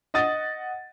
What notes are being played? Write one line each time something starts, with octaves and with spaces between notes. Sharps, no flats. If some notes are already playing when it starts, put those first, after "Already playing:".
D#5 F#5 D#6 A6